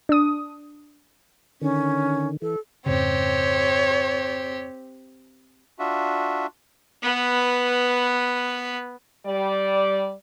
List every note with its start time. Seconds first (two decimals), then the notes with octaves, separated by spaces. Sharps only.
0.09 D4 D#6
1.62 D3 D#3 C#4
2.42 E3 A4
2.86 F2 G#2 C#3 C4 G4 C#5
5.79 D4 F4 F#4 E5
7.03 B3 B4
9.26 G3 D5